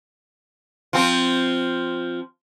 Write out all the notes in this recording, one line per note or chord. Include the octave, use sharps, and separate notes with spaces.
F3 C4